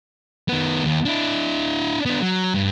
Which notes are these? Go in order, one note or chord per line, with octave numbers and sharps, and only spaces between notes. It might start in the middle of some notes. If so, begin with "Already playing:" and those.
D#3 B3
D#2
D4 E4
B3 D4
F#3
G2